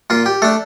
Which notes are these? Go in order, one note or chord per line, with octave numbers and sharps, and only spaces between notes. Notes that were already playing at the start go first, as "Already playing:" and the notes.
A#2 F4
G4
A3 D4 A4